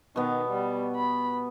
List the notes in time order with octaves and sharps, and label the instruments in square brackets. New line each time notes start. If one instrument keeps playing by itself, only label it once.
[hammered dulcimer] B2 B3 [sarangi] D#3
[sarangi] G3
B5